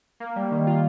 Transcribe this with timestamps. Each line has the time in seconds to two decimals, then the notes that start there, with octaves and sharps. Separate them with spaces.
0.20 A#3
0.36 G3
0.51 D#3
0.67 F4